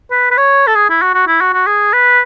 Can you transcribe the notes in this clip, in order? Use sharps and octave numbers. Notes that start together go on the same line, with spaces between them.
B4
B4
C#5
A4
G#4
E4
F#4
F#4
E4
F#4
F#4
G#4
B4